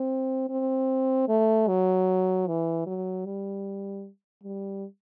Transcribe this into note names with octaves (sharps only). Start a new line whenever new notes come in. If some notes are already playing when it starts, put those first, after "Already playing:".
Already playing: C4
C4
A3
F#3
E3
F#3
G3
G3